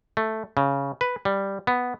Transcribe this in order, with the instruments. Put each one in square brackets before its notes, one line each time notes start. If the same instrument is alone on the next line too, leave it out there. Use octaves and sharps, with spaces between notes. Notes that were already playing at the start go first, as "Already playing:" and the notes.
[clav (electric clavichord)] A3
C#3
B4
G3
B3